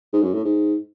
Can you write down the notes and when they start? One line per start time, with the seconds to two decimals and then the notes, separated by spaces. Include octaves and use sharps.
0.13 G#2
0.22 F#2
0.33 A2
0.44 G#2